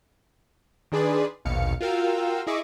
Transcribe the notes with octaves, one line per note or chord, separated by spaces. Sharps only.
D#3 D4 G#4 B4 D5 C6
A#1 D#2 B2 F5 C#7
F4 F#4 A#4 F5 G5 E6
E4 G#4 D#5 E5 C#6 D6